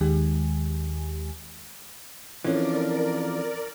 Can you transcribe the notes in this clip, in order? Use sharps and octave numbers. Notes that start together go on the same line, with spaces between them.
D#2 D#3 G#3 G4 G#5
F2 E3 F3 C#4 D4 A#4 D5